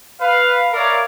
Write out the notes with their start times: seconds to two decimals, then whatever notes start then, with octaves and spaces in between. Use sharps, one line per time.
0.21 B4 F5
0.73 A#4 C#5 D5 E5 F5